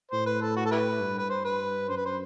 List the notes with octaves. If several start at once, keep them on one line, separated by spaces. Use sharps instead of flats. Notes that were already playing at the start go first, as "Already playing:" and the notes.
A2 C5
B4
A4
F#4
A4
E4 G4 B4
G2
B4
C5
B4
F#2 C5
B4
C5